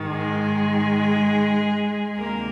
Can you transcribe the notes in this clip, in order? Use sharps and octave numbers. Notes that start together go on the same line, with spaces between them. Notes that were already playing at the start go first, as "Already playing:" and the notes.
Already playing: G#2 D#3
G#3 G#4
D2 C3 D#3 A#3 A#4